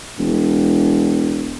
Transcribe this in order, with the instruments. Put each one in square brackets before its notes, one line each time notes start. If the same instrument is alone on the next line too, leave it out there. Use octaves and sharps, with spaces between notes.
[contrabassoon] E1